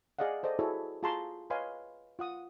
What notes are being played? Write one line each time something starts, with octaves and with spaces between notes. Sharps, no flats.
G#4 D5 D#5 F5 F#5
A4 C5 D5 D#5
E4 F#4 G#4 A4 C#5
F4 G#4 A5 A#5 C6 C#6
B4 C#5 D#5 F5 G#5 C6
F4 F#5 D#6